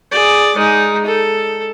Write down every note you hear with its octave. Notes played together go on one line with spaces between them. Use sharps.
G#4 D5
G#3 D#4
A4